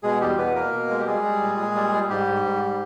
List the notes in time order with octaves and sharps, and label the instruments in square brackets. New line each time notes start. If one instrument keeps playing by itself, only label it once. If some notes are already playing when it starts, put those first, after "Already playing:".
[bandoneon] B2 G#3 G#4
E2 G3 G4
B2 B3 B4
B2 A#3 A#4
B2
G#3
G4
G3 G#3 G#4
G3
A#2
A#2
G3
G3
G#2 G3 G4
G#2
G#2
G3